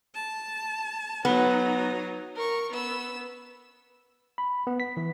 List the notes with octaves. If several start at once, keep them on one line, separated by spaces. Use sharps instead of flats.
A5
F#3 B3 D#4
A#4 C#6
B3 E6
B5
B3
B6
E3